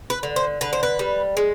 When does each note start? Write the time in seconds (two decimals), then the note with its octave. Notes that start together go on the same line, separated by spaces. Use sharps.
0.10 B4
0.23 D3
0.36 C5
0.61 D3 B4
0.73 C5
0.83 B4
0.99 G3
1.37 G#3